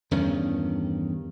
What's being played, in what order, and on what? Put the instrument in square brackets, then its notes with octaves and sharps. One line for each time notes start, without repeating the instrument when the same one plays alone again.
[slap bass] E2 G2 D#3 C#4